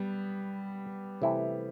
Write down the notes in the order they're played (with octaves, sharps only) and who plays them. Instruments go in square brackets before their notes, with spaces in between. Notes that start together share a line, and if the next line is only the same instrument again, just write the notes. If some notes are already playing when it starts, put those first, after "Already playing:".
Already playing: [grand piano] G3 B3 [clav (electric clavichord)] G4
[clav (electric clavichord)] C3 E3 A3 E4